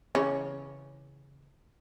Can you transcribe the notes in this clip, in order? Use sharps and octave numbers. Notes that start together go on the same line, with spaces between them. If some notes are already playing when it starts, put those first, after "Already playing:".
C#3 E3 C#4